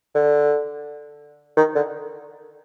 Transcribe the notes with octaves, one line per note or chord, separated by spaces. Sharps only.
D3
D#3
D3